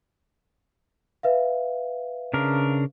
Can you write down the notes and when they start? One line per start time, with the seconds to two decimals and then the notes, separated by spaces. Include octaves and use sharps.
1.23 B4 E5 F5
2.34 C#3 D4 A#4